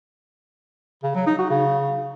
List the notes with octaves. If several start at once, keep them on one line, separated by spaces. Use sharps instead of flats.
C#3
F#3
D#4
F#4
C#3